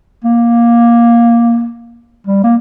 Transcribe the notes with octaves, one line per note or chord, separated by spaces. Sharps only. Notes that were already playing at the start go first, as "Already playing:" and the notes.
A#3
G3
A#3